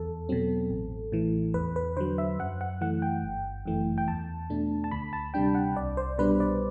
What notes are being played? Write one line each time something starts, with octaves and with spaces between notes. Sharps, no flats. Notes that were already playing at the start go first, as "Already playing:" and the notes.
Already playing: E2 A4
B2 F#3 C4
A1
A2 E3
E2 B4
B4
D3 F#3 C5
E5
F#2 F#5
F#5
E3 A3 F#5
G5
G1
F#2 E3 A3
G5
E2 A5
B2 A3 D4
A5
D2 B5
A5
C3 G3 D4 G5
F#5
C2 D5
C5
B2 G3 D4 B4
D5